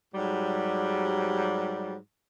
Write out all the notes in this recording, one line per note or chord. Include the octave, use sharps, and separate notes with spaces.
G#2 F#3 G3